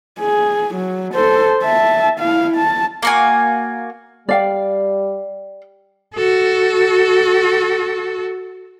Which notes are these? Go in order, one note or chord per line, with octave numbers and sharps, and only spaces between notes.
G#4
F#3
A4 C5
E5 A5
E4 F5
A5
A#3 F#4 G#5
G3 D5 F5 G5
F#4 A4